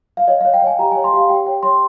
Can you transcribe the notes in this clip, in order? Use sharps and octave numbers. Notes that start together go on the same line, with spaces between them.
F5
C#5 D#5
F5
C#5
G5
C#5 G#5
G4 A#5
G#5
C#5
C6
G4 F5
G4 G5
C#5 G5
C#5 C6